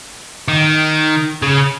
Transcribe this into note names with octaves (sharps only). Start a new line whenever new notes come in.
D#3
C#3